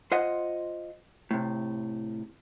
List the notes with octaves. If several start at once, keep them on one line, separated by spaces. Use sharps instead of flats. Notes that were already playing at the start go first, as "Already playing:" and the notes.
F4 C5 D#5 F#5
A2 C3